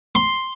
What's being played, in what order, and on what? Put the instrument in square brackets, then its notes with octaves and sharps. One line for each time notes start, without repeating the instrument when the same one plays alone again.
[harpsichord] C6